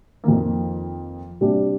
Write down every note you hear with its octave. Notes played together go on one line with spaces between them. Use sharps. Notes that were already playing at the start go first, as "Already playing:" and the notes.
F2 D#3 A#3
C3 G3 D4